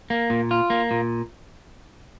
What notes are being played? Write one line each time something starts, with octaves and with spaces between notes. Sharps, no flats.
A#3
A#2
F4
A#3
A#2